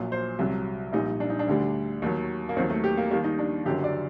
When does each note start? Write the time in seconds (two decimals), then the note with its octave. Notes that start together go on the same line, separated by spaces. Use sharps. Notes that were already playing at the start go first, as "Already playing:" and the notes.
Already playing: A#1 A#2 F#3
0.12 C5
0.39 C2 C3 F#3
0.93 A#1 A#2 G3 D#4
1.20 D4
1.30 D#4
1.39 D4
1.48 D2 D3 G3
2.02 D#2 D#3 F#3
2.49 A#3
2.56 D#2 D#3 F#3 C4
2.70 A3
2.84 G4
2.97 A#3
3.11 D#2 D#3 G3 A#3
3.24 D#4
3.38 D4
3.65 F#1 F#2 D3 F#3 G4
3.84 D5